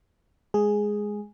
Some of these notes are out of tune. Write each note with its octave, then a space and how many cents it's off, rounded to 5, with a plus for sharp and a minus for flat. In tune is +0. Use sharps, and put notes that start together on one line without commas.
G#3 +0 G#4 +0